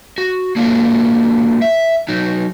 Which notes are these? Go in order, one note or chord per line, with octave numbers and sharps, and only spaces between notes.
F#4
A#3 D4 F4 F#4 A4
E5
F#3 D#4